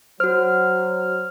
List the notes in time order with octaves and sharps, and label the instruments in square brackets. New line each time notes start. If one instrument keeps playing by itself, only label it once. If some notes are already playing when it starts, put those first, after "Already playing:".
[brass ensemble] F#3 [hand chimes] F#4 C5 [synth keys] F6